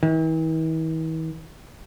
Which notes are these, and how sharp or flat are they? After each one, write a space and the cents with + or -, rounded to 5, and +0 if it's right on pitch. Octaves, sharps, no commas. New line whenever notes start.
E3 -45